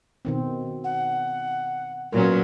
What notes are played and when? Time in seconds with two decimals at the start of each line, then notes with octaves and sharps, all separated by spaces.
0.25 B2 D#3 C4
0.84 F#5
2.12 A#2 F#3 B3 C#4 F4 A#4